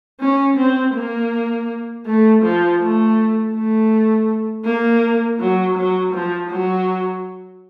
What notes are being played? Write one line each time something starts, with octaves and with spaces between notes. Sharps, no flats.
C#4
C4
A#3
A3
F3
A3
A3
A#3
F#3
F#3
F3
F#3